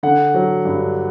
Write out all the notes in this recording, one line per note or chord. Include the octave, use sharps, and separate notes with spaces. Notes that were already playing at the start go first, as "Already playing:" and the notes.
D3 F#5
F#3
G2